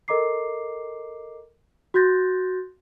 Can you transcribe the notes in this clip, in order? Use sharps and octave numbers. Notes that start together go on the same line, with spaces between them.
A4 A#4 D#5 A#5 D6 C7
F#4 C6 F#6 G6 A6 A#6